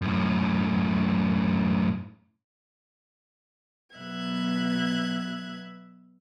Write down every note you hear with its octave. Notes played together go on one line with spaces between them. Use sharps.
F#2 A2
B2 F#3 B3 E5 F#6 G#6